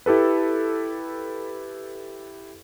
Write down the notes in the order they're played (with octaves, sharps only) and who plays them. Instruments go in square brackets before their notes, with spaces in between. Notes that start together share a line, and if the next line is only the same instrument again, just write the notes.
[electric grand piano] E4 G4 A4 B4